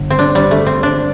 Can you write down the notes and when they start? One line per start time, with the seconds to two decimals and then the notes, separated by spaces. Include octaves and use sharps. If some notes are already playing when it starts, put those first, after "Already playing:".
Already playing: G1
0.10 C4
0.19 D4
0.35 G3
0.51 A3
0.66 C4
0.83 D4